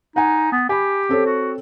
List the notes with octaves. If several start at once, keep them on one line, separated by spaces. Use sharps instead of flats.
D#4 F#5 G#5
B3
G4 G#5 B5
C4 A4 C#5
F#4